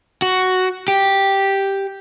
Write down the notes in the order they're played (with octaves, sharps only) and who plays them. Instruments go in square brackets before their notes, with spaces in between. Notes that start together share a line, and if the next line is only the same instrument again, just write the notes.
[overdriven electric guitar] F#4
G4